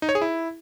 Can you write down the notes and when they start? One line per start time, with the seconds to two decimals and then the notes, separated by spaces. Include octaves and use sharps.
0.02 D#4
0.09 C#5
0.15 G#4
0.22 E4